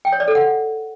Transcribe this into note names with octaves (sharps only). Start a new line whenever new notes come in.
G5
C#5
D5
A4
F#5